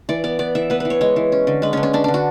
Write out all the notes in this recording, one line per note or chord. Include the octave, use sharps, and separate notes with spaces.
E3 D5
B3 D5
B3 D5
E3 E5
B3 B4
E3 B4
C#5
G#3 C#5
E3
C#4
D3
G#3 B4
D3 C#4
C#4
C#4 D4
D3 D4
F#4